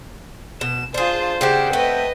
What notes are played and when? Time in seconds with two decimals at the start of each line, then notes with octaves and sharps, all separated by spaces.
0.61 B2 E7
0.94 D4 F4 G#4 C5
1.41 C#3 C4 D4 G4 C5 F#5 G5
1.73 A3 B4 D#5